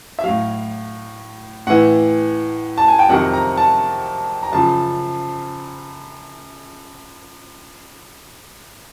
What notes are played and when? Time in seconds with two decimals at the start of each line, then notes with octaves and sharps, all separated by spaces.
0.19 E5
0.24 A2 F#3 F5
1.67 A2 E3 F#5
2.78 A5
2.88 G#5
2.99 G5
3.09 F2 C3 D#3 F#3 F#5
3.33 A#5
3.57 A5
4.43 A#5
4.52 F#2 C#3 F3 A5